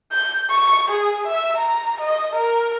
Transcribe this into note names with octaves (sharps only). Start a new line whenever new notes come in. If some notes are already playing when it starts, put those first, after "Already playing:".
G6
C#6
G#4
E5
A#5
D#5
A#4